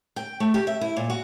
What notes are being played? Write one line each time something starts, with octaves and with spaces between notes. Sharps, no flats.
G5
A3
G4
E5
E4
A#2
F#4